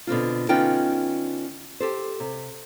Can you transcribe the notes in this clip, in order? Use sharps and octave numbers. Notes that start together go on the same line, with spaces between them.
B2 D3 C4 F4
D3 B3 C#4 D#4 F4 G5
G4 A4 C5
C3